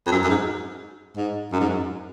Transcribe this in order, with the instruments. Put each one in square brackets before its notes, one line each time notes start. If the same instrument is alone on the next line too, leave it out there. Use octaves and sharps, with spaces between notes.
[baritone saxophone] F2
F#2
F#2
G#2
G#2
F#2
G#2
F#2